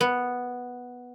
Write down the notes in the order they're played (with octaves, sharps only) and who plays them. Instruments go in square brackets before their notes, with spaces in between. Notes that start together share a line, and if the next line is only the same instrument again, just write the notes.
[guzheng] B3